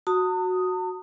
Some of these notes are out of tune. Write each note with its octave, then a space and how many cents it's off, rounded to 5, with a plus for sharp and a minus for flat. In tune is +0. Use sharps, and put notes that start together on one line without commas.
F#4 -5 A5 +45 D#6 +0